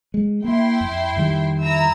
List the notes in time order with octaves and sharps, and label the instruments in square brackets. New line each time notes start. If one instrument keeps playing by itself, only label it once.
[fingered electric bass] G#3
[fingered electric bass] A#3 [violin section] E4 G5 C6
[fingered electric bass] F2
F2 D#3 G3
[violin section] E4 A#5 E6